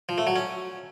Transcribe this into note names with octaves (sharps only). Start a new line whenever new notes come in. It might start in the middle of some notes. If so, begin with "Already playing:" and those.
F3
A3
F#3
C#4